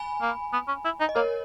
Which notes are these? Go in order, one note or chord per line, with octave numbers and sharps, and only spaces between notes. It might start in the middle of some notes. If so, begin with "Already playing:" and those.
Already playing: G#5 B5
A#3
B3
C#4
E4
D#4
D#5
A#3 A#4 C#5